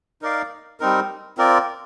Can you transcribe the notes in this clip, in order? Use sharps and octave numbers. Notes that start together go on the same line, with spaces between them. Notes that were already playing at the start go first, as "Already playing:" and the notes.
D#4 A#4 D5 F5
G3 C4 D#4 A#4
C4 F4 A#4 D5